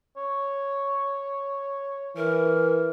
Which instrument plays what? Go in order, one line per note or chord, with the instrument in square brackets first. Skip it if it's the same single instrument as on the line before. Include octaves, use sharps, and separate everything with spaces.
[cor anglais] C#5
[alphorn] E3 [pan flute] A#4